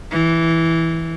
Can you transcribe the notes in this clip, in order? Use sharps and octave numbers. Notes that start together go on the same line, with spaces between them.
E3